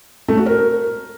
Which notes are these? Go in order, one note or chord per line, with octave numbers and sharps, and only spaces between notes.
A3
F#4
A#4